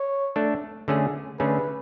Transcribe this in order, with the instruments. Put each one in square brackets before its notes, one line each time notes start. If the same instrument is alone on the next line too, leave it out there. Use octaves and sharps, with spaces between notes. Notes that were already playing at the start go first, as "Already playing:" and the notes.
Already playing: [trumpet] C#5
[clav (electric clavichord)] A3 D4 A4
D3 A3 C#4 G#4
[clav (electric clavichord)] D3 A3 C#4 G#4 [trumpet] B4